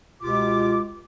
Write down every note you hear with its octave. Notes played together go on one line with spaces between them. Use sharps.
C#2 B2 F4 G4 D6